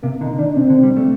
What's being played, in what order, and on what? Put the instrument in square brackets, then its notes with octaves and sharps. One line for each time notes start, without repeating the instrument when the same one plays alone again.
[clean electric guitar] C3 [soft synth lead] A#3
[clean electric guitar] D3 [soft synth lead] D#4
[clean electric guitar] D#3 [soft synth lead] D4
[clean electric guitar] C3 [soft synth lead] C4
[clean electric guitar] D3
G3
A3